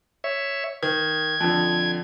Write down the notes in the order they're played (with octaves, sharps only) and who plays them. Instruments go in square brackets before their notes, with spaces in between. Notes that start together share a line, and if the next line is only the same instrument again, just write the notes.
[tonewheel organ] C#5 E5
[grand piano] D#3 [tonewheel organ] G#6
[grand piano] F2 D3